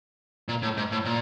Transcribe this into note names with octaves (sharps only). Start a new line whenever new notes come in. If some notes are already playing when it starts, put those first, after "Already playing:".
A#2
A2
G#2
A2
A#2